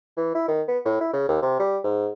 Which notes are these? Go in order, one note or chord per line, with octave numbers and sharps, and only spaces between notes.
E3
E4
D#3
B3
A2
E4
C#3
D#2
C3
G3
G#2